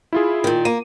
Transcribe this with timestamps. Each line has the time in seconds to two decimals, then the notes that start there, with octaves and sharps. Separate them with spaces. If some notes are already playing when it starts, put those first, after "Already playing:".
0.13 E4 F4 G#4
0.44 A#2 D#3
0.65 A#3 D#7